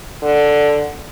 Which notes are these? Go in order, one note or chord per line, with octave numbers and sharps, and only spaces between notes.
D3